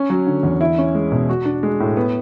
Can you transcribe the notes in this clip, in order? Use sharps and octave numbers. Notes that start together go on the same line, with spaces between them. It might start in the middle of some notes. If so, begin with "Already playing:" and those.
Already playing: C#4
F#3
D3
E2
E4
C#4
G#3
B2
F#4
D4
G#3
A2
B3